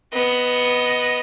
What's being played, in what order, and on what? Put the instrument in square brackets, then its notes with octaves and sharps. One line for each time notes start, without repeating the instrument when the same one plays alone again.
[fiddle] B3 D#5